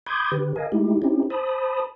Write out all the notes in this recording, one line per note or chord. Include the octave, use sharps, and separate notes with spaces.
B5 C6 D6 D#6 G6 G#6
D3 G4 B4
A#4 D#5 F5 G#5
G#3 A3 D#4 E4 G4
C4 C#4 D#4 E4 G4
C5 A5 B5 D#6